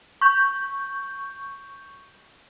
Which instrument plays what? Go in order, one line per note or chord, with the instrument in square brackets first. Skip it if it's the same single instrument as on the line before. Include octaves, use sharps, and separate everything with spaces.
[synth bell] C#6 G6